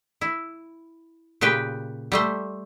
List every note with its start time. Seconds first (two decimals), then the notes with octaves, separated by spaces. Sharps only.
0.21 E4
1.41 A#2 C#3 G4 B4 G5
2.12 G3 A3 C5